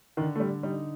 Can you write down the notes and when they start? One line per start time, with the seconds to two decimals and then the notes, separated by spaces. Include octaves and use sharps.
0.17 D3 D#3
0.36 A3
0.40 G3
0.63 G3 D#4